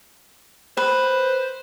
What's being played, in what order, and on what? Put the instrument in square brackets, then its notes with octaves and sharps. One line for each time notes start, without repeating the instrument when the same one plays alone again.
[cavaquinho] B4 [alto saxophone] C5